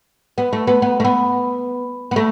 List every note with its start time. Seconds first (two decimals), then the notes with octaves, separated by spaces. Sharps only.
0.38 B3
0.53 A3
0.67 B3
0.82 B3
1.00 A3
1.05 B3
2.11 B3
2.16 A3